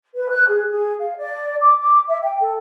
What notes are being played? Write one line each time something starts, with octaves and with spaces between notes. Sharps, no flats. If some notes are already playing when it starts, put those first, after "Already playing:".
B4
F#6
G#4
G#4
F5
D5
D6
D6
E5
G5
A4